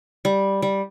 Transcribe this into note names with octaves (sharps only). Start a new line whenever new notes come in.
G3
G3